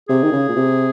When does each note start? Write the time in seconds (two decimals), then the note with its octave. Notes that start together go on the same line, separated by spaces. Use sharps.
0.09 C3 G#4
0.23 D#3
0.32 C#3
0.49 A#2
0.56 C3